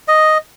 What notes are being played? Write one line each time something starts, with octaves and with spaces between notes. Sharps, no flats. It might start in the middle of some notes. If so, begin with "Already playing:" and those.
D#5